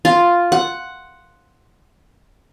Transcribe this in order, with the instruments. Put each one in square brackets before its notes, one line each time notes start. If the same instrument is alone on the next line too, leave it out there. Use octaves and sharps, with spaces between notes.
[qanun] F4
F#5